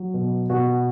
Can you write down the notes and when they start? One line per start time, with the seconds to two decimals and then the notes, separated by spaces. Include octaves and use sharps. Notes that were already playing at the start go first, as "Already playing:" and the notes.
Already playing: F#3
0.14 B2
0.50 B2 F#4